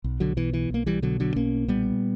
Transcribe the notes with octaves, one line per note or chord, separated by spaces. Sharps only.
B1
D3 F#3
B2 E3
E3
B1 A#3
E3 G3
B2 D3 F#3
D3 F#3
B1 A#3 C#4
A#2 G3 B3